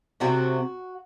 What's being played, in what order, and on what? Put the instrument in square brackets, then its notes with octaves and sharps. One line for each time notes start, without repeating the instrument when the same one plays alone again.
[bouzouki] C3 F#3 A3 C4 F#4